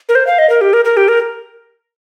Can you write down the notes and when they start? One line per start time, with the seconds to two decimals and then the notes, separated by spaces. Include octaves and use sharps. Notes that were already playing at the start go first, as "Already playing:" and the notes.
0.09 A#4
0.15 C5
0.27 F5
0.39 D#5
0.50 A#4
0.61 G4
0.73 A#4
0.85 A#4
0.97 G4
1.08 A#4